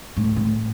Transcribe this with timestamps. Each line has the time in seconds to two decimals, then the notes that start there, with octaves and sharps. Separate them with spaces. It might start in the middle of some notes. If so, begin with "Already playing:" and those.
0.17 A2
0.36 A2